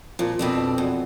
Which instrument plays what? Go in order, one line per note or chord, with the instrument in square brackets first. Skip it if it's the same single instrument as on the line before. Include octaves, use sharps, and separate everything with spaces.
[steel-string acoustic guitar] A#2 [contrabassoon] F3
[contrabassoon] F2 [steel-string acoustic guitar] B2 C4 D4
[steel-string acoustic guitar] E2